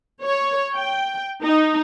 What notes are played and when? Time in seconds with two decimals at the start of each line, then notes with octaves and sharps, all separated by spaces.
0.23 C#5
0.75 G5
1.44 D#4